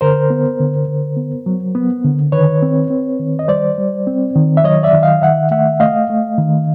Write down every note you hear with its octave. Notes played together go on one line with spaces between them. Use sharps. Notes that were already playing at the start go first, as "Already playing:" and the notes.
D3 A#4 C5
B3
D3
D3
B3
F#3
B3
D3
D#3 B4 C#5
C4
C4
D#3
D#5
G3 C5 D5
G3
C4
D#3
E5
F#3 C#5 D#5
D5 E5
D#3
D#5 F5
D#3 E5 F#5
A3 E5 F#5
A3 D#5 F5
A3
D#3